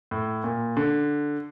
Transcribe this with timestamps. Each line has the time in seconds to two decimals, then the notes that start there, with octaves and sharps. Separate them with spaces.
0.11 A2
0.44 A#2
0.77 D3